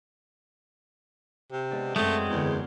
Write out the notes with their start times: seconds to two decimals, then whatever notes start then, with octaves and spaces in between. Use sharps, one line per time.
1.52 C3
1.71 G#3 B3 D4
1.96 F#2 G#3 A3 C4 G#5
2.16 G#5
2.30 E2 D3 A#3 C#4
2.46 C5 C6